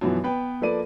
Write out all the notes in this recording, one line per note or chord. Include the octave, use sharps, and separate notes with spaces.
F#2 B2 E3 F3 B3
B3 B4 G5
F3 A#3 A4 B4 D5 D#7